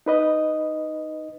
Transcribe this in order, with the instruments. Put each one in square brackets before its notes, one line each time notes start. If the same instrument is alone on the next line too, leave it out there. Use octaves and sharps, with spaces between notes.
[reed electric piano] D#4 B4 D#5